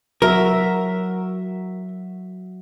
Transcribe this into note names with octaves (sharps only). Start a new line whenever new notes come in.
F#3 F#4 A#4 E5